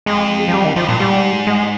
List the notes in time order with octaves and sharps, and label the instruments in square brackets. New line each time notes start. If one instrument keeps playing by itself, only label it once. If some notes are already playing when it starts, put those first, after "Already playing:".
[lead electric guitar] F2 [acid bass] G#3
[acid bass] F3
G3
D#3
[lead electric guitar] F2 [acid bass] F3
[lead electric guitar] G2 [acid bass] A#2
[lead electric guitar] G#2 [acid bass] G3
[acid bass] G#3